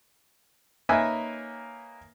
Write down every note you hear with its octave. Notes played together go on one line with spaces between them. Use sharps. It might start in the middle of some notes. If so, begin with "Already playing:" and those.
A#3 C#4 D#4 B4 E5 G#5